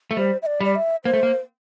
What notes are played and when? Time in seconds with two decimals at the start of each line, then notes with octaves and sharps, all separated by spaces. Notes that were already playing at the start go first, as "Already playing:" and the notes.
0.11 A3
0.17 G3 C5
0.42 E5
0.46 D5
0.60 G3 D5
0.75 E5
1.05 A#3 C5
1.13 A3
1.23 A#3